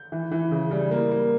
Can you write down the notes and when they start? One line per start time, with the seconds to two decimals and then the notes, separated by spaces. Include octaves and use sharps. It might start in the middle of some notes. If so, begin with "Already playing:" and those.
Already playing: G6
0.12 E3
0.31 E3
0.51 C#3
0.71 G3
0.91 A#3
1.11 A#3